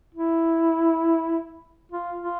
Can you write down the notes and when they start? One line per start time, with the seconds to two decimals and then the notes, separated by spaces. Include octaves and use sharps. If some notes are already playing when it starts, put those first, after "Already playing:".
0.15 E4
1.92 F4
2.21 F4